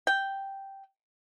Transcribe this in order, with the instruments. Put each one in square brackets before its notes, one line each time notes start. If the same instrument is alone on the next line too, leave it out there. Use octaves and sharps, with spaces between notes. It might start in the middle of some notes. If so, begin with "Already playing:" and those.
[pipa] G5